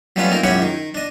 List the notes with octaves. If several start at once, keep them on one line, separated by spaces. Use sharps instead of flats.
F#3 G3 A3 C#4 F4 B4
A#3 C4 D#4 A#4
C#2 F#2 E4 G4 C#5 F#5
D#3
D4 D#5